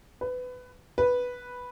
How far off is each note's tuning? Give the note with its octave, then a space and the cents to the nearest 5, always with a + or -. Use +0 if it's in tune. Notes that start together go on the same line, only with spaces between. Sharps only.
B4 +20
B4 -5